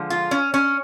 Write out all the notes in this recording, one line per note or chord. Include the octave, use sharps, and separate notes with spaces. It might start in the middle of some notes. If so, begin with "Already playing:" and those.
Already playing: D3 F3 G#3
F4
C#4
C#4